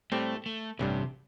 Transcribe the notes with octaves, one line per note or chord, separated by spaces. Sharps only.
A2 G3 A3 C4 G4
A3
A1 G2 C3 G3 D4